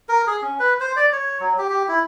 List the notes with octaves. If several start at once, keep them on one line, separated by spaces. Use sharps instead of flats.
A#4
G#4
C#4
B4
C5
D5
C#5
F#3
G4
G4
E4